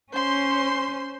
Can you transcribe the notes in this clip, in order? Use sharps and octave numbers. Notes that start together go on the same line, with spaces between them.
C#4 C5 C6